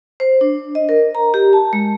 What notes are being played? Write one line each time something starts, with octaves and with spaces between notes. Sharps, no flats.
C5
D4
D#5
A#4
A#5
G4
A5
G#3